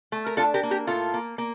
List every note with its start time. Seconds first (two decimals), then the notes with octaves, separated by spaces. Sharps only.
0.12 A3
0.26 A#4
0.37 D4 F4 A4
0.54 G4 A#4
0.63 A#3
0.71 G4 A#4
0.87 A2 F4 A4
1.14 A#3
1.38 A#3